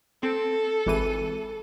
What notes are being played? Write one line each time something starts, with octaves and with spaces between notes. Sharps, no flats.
C4 A4
G#1 E3 D#7